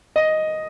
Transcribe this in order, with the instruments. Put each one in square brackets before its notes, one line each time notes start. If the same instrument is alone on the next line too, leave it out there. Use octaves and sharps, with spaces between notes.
[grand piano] D#5